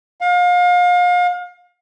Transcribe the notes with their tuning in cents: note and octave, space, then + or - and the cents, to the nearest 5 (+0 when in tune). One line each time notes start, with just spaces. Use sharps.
F5 +35